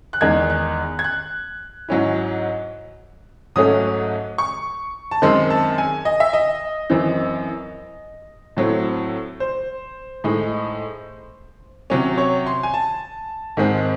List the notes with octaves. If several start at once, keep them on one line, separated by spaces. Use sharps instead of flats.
F#6
E2 D#3 G#3 D#4 G#6
F#6
G#6
F#6
G#2 F#3 C#4 E4
G#2 F#3 A3 C#4 D#6
C#6
A5
F#2 D#3 G#3 C4 C6
A5
G#5
D#5
E5
D#5
F#2 E3 C4
A2 F#3 C4 E4
C5
A2 G#3 D#4
C3 F#3 C#4
C#5
C6
G#5
A5
G#2 D#3 G#3 C4